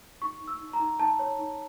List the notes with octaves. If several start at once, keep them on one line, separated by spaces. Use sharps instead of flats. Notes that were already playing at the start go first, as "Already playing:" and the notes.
D#4 C#6
D#4
E6
D#4
A#5
D#4
D#4 A5
C#5
D#4